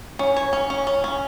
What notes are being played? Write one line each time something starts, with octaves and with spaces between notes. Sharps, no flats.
C#4
C#5
C#4
C#4
C#4
C#4